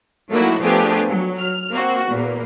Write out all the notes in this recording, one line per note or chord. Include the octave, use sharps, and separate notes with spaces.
F#3 A3 A#3 D#4 E4 F#4
F3 A3 B3 D4 G4 G#4
F#3
F6
A#3 C4 F#4
E2 A#2 A#3